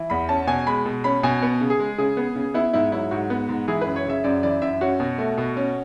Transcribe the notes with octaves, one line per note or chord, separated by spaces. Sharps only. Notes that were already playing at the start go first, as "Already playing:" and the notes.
Already playing: E3
E2 B5
C#4 A5
B2 G#5
G#3 B5
B2
C#4 B5
B2 G#5
B3
C#3
G#4
G#3
C#3 G#4
B3
C#3
B3 E4
G#2 E4
F#3 E4
G#2 F#4
B3
G#2
E3 G#4
B4
F#2
C#5
C#3 E5
F#2 D5
E3 D5
F#2 E5
C#4 F#4
B2
A3
B2
C#4